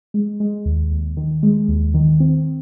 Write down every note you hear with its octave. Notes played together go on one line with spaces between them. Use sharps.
G#3
G#3
D#2
D#2
D#3
G#3
D#2
D#3
C4